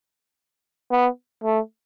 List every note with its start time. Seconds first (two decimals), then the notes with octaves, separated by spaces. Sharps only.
0.92 B3
1.44 A3